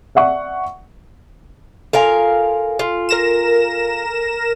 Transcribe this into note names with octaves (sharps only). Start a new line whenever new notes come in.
D5 E5 F#5 C#6
F4 A4 A#4 F5 G#5
F4
A#4 A#6 E7